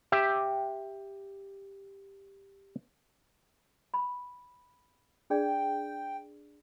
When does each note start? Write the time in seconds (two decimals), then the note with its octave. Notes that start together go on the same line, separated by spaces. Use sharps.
0.12 G4 E5
3.94 B5
5.30 D4 G#4 D5 G5